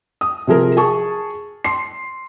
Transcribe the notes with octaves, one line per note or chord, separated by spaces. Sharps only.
D#6
C3 F3 G#4 A#4
G#4 A5 C#6
C6 C7